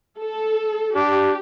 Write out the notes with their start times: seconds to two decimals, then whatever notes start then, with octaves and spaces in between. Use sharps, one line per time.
0.19 A4
0.95 D4 G4